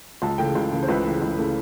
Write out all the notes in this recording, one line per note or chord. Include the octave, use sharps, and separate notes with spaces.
C#2 A5
C#3 E3 A3 G5
C#2 F5
C#3 E3 A3
C5
C#2 B4
C#3 E3 A3
C#2
C#3 E3 A3